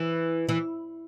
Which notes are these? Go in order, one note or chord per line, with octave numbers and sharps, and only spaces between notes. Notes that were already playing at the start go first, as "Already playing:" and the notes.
Already playing: E3
E3